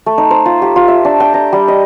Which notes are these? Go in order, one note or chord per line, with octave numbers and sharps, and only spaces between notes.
A3
D#4
C5
F4
G4
F4
E5
D4
G5
A#5
G3
D#5